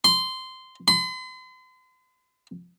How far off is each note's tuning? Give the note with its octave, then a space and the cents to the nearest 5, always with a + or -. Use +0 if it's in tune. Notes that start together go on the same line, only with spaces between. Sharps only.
C6 -15
C6 -45